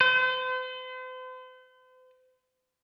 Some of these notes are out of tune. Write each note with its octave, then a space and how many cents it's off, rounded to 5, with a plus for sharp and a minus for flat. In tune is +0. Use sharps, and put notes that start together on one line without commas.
C5 -40